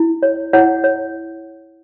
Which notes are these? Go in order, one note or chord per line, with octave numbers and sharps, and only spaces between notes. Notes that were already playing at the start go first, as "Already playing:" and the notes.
Already playing: E4
C#5
E4 C#5 F#5
C#5